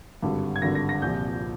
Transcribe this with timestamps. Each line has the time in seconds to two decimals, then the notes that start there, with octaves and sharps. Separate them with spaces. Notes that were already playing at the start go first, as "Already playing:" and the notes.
0.23 G#1 G2 D3
0.56 G#6
0.62 G#1 G2 D3 A#6
0.75 A#6
0.89 A#6
1.02 C2 A#2 F3 G6